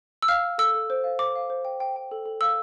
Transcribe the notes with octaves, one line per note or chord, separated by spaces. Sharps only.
E6
F5 F6
F5
A4 E6
A4
C5
F5
C5 D6
F5
C5
G5
G5
G5
A4
A4
F5 E6